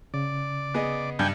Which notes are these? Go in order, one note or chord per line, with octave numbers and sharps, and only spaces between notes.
C#3 D5
B3 G#4 D#5
G2 G4 G5 G#5